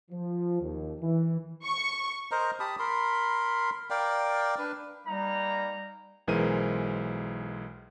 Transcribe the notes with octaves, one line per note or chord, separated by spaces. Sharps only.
F3
D#2
E3
C#6
A#4 C5 D#5 A#5
G4 A5 B5 D#6
A#4 B5 C6
A#4 D5 F5 G5
D4 B4
G3 A#3 D#4 A#5
B1 E3 G#3 A#4 C5 D#7